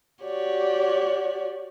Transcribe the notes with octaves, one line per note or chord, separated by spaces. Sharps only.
F#4 G4 C#5 D5